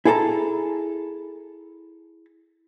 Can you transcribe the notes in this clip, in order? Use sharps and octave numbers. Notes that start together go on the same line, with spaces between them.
E4 G#4 A4 C#5 A5 A#5